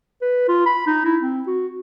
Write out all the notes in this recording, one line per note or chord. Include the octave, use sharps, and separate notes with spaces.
B4
F4
B5
D#4
E4
C4
F#4